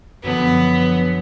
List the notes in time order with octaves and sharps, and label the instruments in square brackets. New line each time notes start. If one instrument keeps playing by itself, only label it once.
[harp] F#2 D3 F3 [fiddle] B3